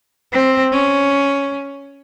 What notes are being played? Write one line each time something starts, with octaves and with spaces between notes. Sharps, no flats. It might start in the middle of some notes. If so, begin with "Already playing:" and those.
C4
C#4